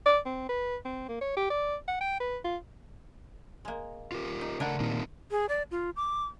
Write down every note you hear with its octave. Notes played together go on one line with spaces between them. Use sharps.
D5
C4
B4
C4
A#3
C#5
G4
D5
F#5
G5
B4
F4
G#3 A#3
F4 G4 A#4
D#4
C#3 A3 D4 E4 A#4 F#5
A#2 D#3 A#3 C4 D#4 F4
G#4
D5
F4
D6